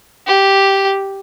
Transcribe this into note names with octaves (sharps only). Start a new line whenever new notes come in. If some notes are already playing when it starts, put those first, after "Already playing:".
G4